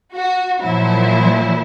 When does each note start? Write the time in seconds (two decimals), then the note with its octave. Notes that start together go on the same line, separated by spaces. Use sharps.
0.15 F#4
0.62 A#2 F3 F#3 E4